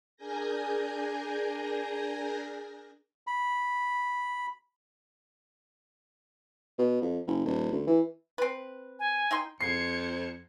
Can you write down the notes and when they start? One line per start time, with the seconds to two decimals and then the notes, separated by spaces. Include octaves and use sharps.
0.17 D4 G#4 A#4 G#5 G6 A#6
3.27 B5
6.78 B2
7.02 F2
7.27 F#1
7.45 D#1
7.72 D2
7.87 E3
8.38 C4 B4
8.99 G#5
9.31 D#4 G5 C6
9.61 F2 C5 G#6 C7 C#7